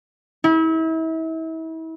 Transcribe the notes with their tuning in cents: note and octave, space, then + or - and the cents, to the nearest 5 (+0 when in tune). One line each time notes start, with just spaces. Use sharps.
E4 -35